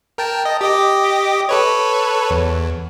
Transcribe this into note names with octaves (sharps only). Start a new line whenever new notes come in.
A#4 G5 A5
D#5
G4 D#5 D6
A4 B4 C#5
E2